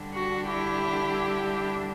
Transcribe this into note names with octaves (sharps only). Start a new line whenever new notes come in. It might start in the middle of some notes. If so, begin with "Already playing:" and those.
Already playing: D3 G3 D4
F#4
E4 G4